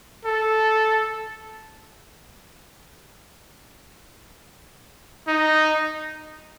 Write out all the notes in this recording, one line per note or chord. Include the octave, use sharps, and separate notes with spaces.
A4
D#4